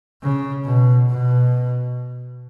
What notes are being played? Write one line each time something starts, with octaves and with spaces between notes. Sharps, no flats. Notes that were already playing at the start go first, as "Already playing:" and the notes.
C#3
B2
B2